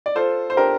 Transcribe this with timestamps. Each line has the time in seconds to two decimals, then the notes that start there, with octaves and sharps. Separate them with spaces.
0.06 D5
0.15 F4 A4 C5
0.50 C5
0.57 D4 G4 A#4